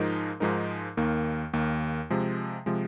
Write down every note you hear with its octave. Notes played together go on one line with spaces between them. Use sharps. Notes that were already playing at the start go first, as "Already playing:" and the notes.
Already playing: G#2 F3 G#3 D#4 A#4
G#2 F3 G#3 D#4 A#4
D#2 D#3 A#3
D#2 D#3 A#3
C3 F3 G#3
C3 F3 G#3